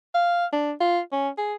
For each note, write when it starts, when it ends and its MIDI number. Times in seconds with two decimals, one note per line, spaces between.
0.14 0.46 77
0.53 0.72 62
0.80 1.01 65
1.12 1.29 61
1.38 1.54 68